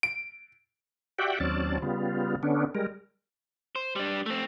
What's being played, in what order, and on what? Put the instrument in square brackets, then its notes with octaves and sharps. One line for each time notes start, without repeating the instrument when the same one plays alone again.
[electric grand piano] D7
[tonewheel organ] F#4 G4 D5 E5 F#5 G5
D#2 F#3 C4 C#4 D5 A5
C#3 G3 B3 F4
D3 B3 C#4 D4
G3 G#3 A#4
[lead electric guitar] C5
G3 D4
A3 C4